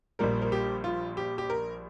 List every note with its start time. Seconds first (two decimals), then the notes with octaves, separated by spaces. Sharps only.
0.19 A#1 A#2 G3 A#3 A#4
0.42 A#4
0.52 G4
0.84 F4
1.17 G4
1.38 G4
1.50 A#4